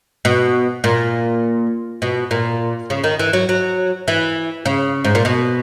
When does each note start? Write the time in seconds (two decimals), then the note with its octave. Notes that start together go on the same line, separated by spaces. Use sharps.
0.25 B2
0.84 A#2
2.02 B2
2.31 A#2
2.90 C#3
3.04 D#3
3.19 E3
3.33 F#3
3.49 F#3
4.08 E3
4.65 C#3
5.04 G#2
5.15 A#2
5.25 B2